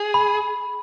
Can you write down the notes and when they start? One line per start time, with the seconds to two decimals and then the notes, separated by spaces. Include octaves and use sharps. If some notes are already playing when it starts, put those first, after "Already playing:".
Already playing: G#4
0.14 B5